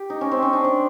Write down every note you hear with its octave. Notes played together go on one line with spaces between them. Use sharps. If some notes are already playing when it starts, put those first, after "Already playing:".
Already playing: G4
D#4
C#4
C4
C#4
D4
D4